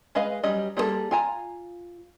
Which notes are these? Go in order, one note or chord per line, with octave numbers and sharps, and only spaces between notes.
G#3 G#4 B4 D#5 F5
F#3 G3 C#4 D#5
G3 A#3 D4 G#4 A4
F4 G#5 A#5